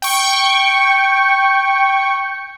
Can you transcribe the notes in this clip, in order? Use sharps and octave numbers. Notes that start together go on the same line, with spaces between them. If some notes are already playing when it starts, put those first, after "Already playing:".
G5 C#6